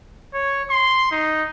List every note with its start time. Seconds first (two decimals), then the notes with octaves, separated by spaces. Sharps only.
0.34 C#5
0.70 C6
1.11 D#4